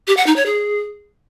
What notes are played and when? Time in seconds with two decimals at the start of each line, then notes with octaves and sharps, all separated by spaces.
0.07 G4
0.17 F#5
0.27 D#4
0.36 C#5
0.46 G#4